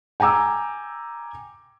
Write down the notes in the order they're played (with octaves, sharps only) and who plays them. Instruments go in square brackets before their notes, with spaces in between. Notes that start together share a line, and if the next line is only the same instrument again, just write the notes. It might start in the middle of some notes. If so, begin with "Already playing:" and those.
[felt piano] G5 G#5 A#5 D6 E6